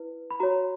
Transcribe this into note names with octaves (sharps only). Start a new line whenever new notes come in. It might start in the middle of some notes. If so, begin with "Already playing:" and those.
Already playing: E4 B4
B5
F#4 C#5 A#5